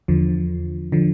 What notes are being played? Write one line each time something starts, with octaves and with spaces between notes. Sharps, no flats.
E2 D3 F3
D3 F3